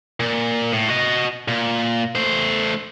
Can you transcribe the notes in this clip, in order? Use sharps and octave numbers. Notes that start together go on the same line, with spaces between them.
A#2
A2
F#4 D#5
A#2
A3 C5